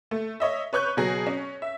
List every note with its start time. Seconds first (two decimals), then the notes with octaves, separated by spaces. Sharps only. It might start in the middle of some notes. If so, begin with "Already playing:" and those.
0.11 A3
0.40 C#5 D#5 E5
0.73 B4 C#5 C#6 F#6 G6
0.97 B2 F#3 G#4 A#6
1.27 C#4
1.62 E5